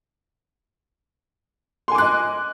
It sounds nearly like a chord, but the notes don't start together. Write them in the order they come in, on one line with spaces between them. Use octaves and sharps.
C6 G#5 D6 F#6 D#5